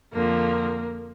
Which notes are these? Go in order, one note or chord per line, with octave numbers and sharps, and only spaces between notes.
F2 D3 F3 A#3